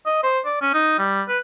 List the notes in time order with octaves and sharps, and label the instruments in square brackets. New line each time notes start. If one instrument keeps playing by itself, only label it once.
[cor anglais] D#5
C5
D5
C#4
D#4
G3
B4